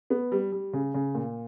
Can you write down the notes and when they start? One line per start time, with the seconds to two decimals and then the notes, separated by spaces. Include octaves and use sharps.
0.10 B3
0.32 G3
0.52 G3
0.73 C#3
0.94 C#3
1.15 A#2